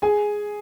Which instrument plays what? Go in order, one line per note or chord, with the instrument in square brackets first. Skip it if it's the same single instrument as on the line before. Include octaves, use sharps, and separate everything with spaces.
[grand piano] G#4 G#5